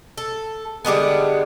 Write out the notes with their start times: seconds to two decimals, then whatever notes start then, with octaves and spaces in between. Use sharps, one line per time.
0.17 A4
0.85 D3 G3 G#3 B3